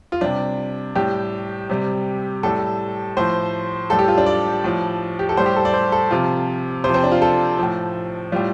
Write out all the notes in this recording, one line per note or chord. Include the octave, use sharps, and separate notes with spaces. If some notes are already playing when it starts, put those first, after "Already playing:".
F4
C3 G3 D4
A2 G3 G4
C3 G3
A2 G3 A4
A2 F3 C5
A2 G3 A4
G4
F4
D4
D5
A2 F3
G4
A4
A2 G3 C5
G4
A4
D5
C5
A4
C3 F3 F4
C3 F3 C5
C4
D4
F4
A4
A2 F3
A2 G3 F4